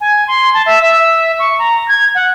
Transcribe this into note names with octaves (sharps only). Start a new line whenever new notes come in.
G#5
C6
A5
E5
E5
C#6
A#5
G#6
F#5